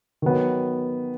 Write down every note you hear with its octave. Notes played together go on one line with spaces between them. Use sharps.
D#3 F#3 B3